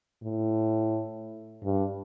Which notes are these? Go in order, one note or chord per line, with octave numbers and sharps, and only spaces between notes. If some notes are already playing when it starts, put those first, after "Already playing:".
A2
G2